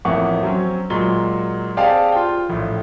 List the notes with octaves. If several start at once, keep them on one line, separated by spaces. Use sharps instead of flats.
A1 F2 E3 A#3 F#5 C#6
F#3 C4 C#4
A#2 F#3 G#3 F#4 G7
C4 G4 G#4 D5 F5 A5
F4 G5
A#1 A2